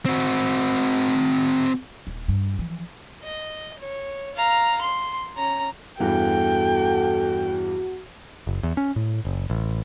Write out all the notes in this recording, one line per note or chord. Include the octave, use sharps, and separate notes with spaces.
C4 F#4
D#1
G2
E3 F3
D#5
C#5
F5 A#5
C6
C#4 A#5
E2 G2 E3 F#4 A4 G5
F#1
E2
C#4
A2
F#1
A1